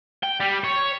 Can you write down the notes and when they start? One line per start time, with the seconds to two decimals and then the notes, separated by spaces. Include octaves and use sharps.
0.23 G5
0.40 G3
0.64 C#5